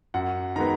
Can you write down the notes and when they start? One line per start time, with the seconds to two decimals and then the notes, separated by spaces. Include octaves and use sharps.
0.14 F#2 F#5
0.56 D#3 G#3 B3 A#5